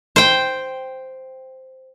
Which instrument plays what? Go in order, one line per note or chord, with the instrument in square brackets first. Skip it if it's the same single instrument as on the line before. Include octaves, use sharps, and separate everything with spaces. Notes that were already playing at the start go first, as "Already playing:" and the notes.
[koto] C5 G5